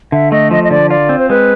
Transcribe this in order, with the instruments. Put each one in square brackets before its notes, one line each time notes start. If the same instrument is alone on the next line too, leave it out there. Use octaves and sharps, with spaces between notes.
[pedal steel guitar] D3 [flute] E5
[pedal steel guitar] A3 [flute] D#5
[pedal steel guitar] F3 [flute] D#5
[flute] D#5
[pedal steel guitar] D3 [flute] D5
[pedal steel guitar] F4 [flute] D5
[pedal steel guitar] C4
[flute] C5
[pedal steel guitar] G#3 [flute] B4